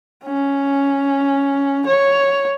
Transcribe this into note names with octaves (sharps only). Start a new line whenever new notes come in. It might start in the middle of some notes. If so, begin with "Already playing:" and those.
C#4
C#5